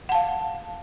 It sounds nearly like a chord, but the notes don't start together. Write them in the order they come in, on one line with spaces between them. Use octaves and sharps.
F#5 A5 F5